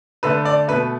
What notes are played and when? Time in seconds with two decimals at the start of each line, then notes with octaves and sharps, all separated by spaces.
0.23 D3 A3 B4
0.45 D5
0.68 B2 A3 B4